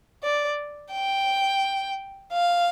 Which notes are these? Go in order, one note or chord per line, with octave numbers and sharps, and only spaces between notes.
D5
G5
F5